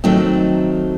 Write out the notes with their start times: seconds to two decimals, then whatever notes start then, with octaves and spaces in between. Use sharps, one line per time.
0.04 D#3 F#3 A3 C4 D#4